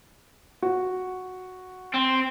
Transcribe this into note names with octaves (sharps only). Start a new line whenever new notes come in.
F#4
C4